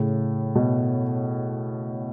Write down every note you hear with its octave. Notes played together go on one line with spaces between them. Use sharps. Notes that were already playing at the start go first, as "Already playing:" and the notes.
Already playing: A2 C#3
B2